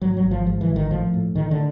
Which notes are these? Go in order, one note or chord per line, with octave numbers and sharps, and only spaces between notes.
G#2 F#3
F#3
G#1
F3
G#2 F3
E3
G#1
D#3
A2 F3
A2
A2 D#3
D3